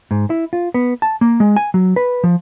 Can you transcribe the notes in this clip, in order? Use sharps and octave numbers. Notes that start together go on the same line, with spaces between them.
G#2
E4
F4
B3
A5
A#3
G#3
G#5
F#3
B4
F3